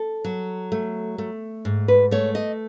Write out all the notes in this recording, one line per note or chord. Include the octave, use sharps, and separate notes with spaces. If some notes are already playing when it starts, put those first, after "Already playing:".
Already playing: A4
F#3
A3
A3
G#2
B4
A3 C#5
D#5